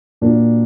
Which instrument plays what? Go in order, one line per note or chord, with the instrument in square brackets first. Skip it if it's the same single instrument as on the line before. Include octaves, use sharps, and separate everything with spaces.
[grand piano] A#2 A#3 D4 F#4 A#4